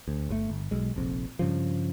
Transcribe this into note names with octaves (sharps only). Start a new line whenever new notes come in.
D2
G1 B2 A3
G1
B1 G#3
F1 A#1 F2
G2 C#3 F3